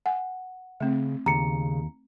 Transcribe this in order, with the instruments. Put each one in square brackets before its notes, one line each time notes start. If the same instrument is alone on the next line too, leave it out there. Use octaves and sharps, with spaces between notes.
[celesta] F#5 [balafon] G#5
[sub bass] C#3 [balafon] A3 C4
[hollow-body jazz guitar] D#2 [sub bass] C#3 [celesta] A#5 C#7